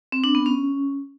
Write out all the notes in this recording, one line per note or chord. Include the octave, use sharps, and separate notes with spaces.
C4
D4
B3
C#4